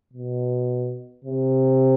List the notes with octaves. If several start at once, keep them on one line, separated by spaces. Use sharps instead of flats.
B2
C3